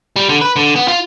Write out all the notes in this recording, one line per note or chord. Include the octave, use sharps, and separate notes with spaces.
G3
D3
B4
D3
B3
F4